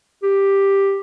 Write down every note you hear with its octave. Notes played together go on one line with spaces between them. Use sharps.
G4